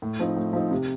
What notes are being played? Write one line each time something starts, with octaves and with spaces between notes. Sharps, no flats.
A2
F3 C4 D#4
A2
F3 C4 D#4
C3